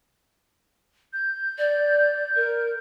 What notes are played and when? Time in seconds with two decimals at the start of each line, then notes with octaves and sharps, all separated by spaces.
1.13 G6
1.58 D5
2.36 A#4